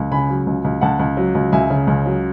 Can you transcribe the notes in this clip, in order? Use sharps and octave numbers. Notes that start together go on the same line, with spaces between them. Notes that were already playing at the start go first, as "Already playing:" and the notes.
Already playing: C#2
C#3 G#5 B5
F#3
C#2
C#2
C#2 F#5 A5
C#2
F#3
C#2
C#2 E5 G#5
C#3
C#2
F#3